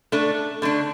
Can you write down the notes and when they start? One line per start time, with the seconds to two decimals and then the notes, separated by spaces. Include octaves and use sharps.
0.12 A3 D4 A4
0.62 D3 A3 D4